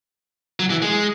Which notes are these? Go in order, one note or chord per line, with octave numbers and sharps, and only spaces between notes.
F#3
E3
G#3